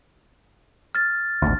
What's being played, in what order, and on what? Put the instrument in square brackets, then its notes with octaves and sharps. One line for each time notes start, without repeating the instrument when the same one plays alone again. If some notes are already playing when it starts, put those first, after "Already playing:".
[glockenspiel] F6 A6
[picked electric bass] G#1 D2